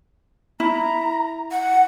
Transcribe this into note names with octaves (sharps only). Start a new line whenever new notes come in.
E4 A#5
F#5